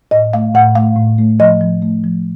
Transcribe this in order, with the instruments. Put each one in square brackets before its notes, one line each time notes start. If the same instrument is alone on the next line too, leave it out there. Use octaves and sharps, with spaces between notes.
[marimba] A2 D#5
A3 F5
A2 F#5
A3 F5
A2
A3
F3 D#5
F3
A3
F3